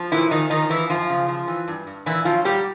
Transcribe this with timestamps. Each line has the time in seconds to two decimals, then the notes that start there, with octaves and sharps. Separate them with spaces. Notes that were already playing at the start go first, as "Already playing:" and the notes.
Already playing: F3
0.12 A#2 E3 E4
0.31 A#2 D#3 D#4
0.50 D#3 F3 D#4
0.70 E3 F3 E4
0.90 F#2 F3 F4
1.09 C#3
1.28 F3
1.48 E3
1.68 G2
1.87 G2
2.06 A#2 E3 E4
2.25 F3 F#3 F4
2.45 A#2 G3 G4